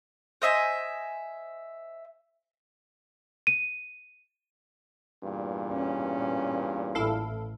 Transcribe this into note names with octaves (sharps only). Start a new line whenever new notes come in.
C5 D#5 E5 G#5
D#7
E2 G2 A#2
C#4
A1 E4 A4 F5